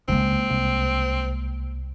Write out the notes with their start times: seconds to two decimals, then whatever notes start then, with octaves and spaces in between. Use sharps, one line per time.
0.08 C#2 G#3 A#3 C4
0.50 C2